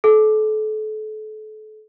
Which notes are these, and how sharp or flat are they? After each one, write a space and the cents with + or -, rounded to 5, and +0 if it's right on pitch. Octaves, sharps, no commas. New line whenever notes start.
A4 -35